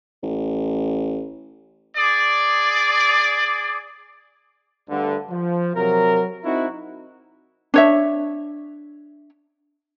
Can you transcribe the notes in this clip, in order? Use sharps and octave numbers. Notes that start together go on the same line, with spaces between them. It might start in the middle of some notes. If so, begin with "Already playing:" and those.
A1
G#4 D5
D2 G2 D3
F3
C3 F#3 A#4
C4 D#4 E4 F#4
D4 C#5 E5